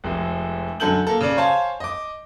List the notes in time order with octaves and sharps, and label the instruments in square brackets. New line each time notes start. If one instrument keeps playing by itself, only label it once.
[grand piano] F1 F2 G#3
F#2 D3 A4 G#5 G6 F#7
A#3 A4
C#3 D5
C5 C#5 F5 G#5 A5
D#5 D6